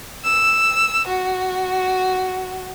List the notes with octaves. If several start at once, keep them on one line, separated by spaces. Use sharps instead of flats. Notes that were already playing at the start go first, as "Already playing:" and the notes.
E6
F#4